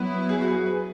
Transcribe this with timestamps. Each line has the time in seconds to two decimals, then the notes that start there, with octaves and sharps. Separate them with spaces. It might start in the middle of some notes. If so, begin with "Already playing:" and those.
Already playing: F#3 B3 E4 B4
0.29 G#4
0.41 F#4
0.48 G#4
0.66 B4